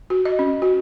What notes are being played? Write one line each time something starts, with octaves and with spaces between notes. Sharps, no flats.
F#4
D#5
C#4
F#4